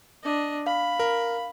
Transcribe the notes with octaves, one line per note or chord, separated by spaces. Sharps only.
D4 D#5
F5 B5
A#4